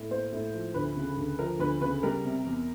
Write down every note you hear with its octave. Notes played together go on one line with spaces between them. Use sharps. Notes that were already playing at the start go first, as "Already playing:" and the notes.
Already playing: A2
A#3 C5
A2
F3
D2 B4
C#3
D2
F3 A#4
D2 B4
C#3 B4
G3 A#4
C3
E2